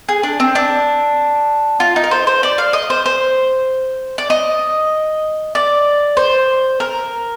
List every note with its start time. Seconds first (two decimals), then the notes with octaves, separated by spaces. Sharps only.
0.09 G#4
0.23 D4
0.40 C4
0.55 D4
1.80 F4
1.96 D#4
2.04 A#4
2.11 C5
2.27 C5
2.43 D5
2.58 F5
2.73 D#5
2.90 C5
3.06 C5
4.18 D5
4.30 D#5
5.55 D5
6.17 C5
6.80 A#4